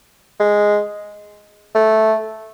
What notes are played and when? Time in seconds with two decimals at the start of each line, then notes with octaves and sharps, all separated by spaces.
0.39 G#3
1.75 A3